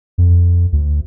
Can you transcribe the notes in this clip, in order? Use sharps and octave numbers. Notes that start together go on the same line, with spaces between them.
F2
D2